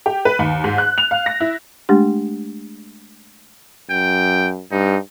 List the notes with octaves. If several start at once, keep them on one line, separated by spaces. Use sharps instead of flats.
G4
B4
D#2
G#2
F#6
F7
F5
A#6
E4
G#3 A3 D4 G4
F#2 G5
G2 D#4